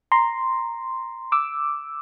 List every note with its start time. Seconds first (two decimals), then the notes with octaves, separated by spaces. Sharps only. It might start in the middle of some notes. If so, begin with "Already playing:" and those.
0.12 A#5 C6
1.32 D6 E6